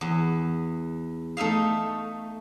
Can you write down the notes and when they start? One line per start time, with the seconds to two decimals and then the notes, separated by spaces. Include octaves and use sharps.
0.01 E2
1.37 A3 D#4 E5 F5